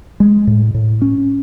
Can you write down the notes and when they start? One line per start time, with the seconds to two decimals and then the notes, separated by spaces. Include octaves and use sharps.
0.20 G#3
0.47 A2
0.74 A2
1.02 C#4